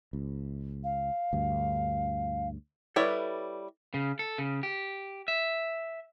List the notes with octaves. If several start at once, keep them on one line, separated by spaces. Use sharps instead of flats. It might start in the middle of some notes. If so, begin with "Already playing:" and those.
C#2
F5
D2 G2
G3 E4 A4 B4 C#5 D5
C#3
A4
C#3
G4
E5